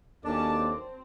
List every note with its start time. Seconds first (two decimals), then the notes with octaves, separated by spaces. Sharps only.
0.24 D#2 F#3 C#4 D4 A4 D5 A5
0.55 C4